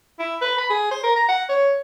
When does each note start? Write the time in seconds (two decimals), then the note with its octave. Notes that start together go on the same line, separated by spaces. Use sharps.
0.19 E4
0.41 B4
0.58 B5
0.70 G#4
0.91 C5
1.04 A#4
1.16 A#5
1.29 F#5
1.49 C#5